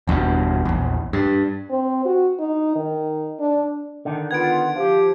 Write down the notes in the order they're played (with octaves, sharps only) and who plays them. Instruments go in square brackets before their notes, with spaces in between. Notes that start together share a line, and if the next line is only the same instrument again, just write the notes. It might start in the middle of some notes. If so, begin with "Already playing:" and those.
[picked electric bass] G1 E2 G2 B2
A#1 E2
G2
[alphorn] C4
F#4
D#4
D#3
D4
[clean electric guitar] D3 D#3
[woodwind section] B3 F4 [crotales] G#6 D7
[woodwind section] F3 G4